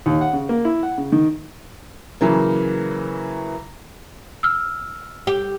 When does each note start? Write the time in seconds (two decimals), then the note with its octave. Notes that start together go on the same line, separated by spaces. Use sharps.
0.06 D#2
0.21 F#5
0.33 C#3
0.49 A#3
0.65 E4
0.83 F#5
0.98 C#3
1.12 D#3
2.21 C#3 E3 F#3 A#3
4.43 E6 F6
5.27 G4